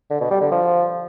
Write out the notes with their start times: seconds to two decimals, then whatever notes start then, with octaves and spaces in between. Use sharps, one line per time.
0.10 D3
0.20 B2
0.31 G3
0.41 D3
0.51 F3